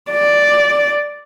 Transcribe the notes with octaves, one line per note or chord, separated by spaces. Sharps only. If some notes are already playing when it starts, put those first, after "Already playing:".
D5